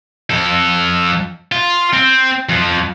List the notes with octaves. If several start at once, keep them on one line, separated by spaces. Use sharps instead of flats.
F2 A4
F4
C4
F2 F3